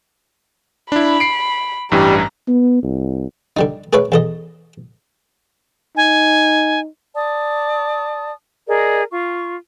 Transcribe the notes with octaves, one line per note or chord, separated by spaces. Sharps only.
D4 E4 B5
C7 D7
A1 G2 E3 G3 A#5
B3
C2
D3 G3 D#4
G#4 A#4 B4 C#5 E5
E2 A4 D#5
D#4 G#5
D5 A5 D#6
G#4 A#4 D5 D#5
F4 C#6